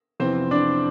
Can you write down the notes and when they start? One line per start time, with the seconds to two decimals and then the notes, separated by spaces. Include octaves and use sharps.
0.20 F1 F2 E3 B3 C4 C5
0.51 D4 D5